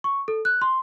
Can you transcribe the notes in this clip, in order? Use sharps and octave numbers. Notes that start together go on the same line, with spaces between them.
C#6
A4
F#6
C6